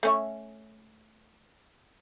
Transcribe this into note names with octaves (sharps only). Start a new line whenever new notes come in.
A3 C#4 E5